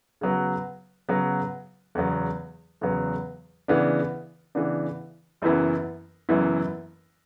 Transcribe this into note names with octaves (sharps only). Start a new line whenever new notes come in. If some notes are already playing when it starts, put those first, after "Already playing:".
C#3 F#3 B3 F#4
C#3 F#3 B3 F#4
E2 C#3 F#3 B3
E2 C#3 F#3 B3
C#3 E3 B3 D4
C#3 E3 B3 D4
F#1 F#2 E3 B3 E4
F#1 F#2 E3 B3 E4